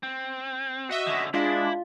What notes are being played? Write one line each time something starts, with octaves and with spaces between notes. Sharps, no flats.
C4
F#4 D#5 E5
D3 C#4
G#3 D4 E4 F4